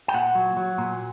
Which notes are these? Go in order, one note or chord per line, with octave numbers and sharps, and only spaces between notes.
G5
A#2 F#5
F#3
F#3
A#2